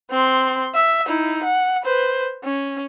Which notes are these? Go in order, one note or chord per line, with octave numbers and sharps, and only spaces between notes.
C4 C6
E5
D#4 E4
F#5
B4 C5
C#4